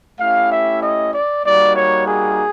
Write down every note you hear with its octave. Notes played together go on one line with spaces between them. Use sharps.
A3 C#4 E4 G4 F5
E5
D#5
D5
G3 A#3 D#4 F#4 D5
C#5
G#4